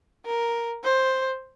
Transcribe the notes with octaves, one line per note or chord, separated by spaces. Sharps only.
A#4
C5